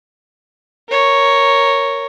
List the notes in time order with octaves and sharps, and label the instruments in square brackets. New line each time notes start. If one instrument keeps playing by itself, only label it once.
[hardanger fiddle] A#4 C#5